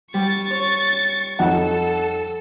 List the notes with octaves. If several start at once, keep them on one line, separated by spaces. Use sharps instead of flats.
G3 C#6 A6
C#5
F2 D#4 A4 F#5